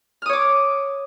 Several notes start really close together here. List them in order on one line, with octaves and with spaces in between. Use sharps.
F6 D#6 C#5 D6